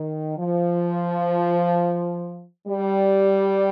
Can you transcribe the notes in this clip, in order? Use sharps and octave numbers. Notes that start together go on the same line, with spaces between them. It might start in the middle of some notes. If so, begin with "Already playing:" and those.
Already playing: D#3
F3
G3